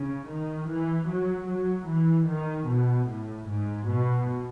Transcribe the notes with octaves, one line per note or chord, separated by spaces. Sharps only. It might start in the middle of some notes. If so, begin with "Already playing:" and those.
Already playing: C#3
D#3
E3
F#3
F#3
E3
D#3
B2
A2
G#2
B2